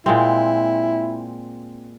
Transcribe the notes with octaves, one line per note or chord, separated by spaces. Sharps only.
A#2 G#3 C4 E4